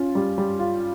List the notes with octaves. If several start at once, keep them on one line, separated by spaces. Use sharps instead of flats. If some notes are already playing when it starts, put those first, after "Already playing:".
Already playing: C#4 F4
G3
G3
F4